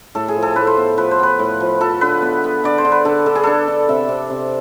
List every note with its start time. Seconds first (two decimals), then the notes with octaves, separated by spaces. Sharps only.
0.15 A2 A4
0.28 G#4
0.36 F3
0.42 A4
0.56 A2 B4
0.67 C5
0.77 B3
0.98 F3 B4
1.11 C5
1.19 B3 B4
1.39 A2
1.60 F3
1.81 F3 A4
2.01 D3 B4
2.22 B3
2.44 B3
2.64 D3 D5
2.78 C5
2.85 D3
2.92 B4
3.05 D3 A4
3.26 D3 A4
3.35 G#4
3.43 D4 A4
3.68 D4
3.89 C3 E5
4.09 C3
4.30 C3